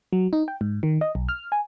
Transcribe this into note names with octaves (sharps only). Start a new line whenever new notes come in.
F#3
D#4
G5
G#2
D#3
D#5
B1
F6
G#5